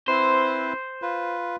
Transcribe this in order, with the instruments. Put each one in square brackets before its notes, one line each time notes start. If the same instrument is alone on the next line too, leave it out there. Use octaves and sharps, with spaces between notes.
[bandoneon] C4 E4 B4 [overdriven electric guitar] C5
[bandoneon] F4 B4